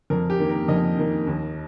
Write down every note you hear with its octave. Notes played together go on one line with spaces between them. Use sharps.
F2 A#4
G4
D#3 A#3
A#4
F2 A#4 D#5
D#3 A#3
D#2